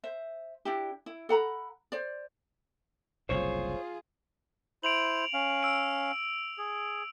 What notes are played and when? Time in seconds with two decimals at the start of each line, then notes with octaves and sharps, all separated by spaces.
0.04 C5 E5
0.65 D4 E4 G4
1.06 E4
1.29 A4 F#5 A#5 B5
1.92 C5 D5
3.29 F#1 C2 A2 F4 G#4 C5 C#5
4.83 E4 C5 D7 F7 F#7
5.34 C#4 F5
5.63 E6 D7
6.58 G#4